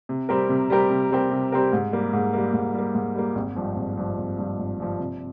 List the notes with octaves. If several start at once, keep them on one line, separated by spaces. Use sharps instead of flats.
C3
G3 C4 G4 A#4
C3
G3 C4 G4 A#4
C3
G3 C4 G4 A#4
C3
G3 C4 G4 A#4
G#2
G3 A#3
G#2
G3 A#3
G#2
G3 A#3
G#2
G3 A#3
G#1
G2 F3
G#1
G2 F3
G#1
G2 F3
G#1
G2 F3
C3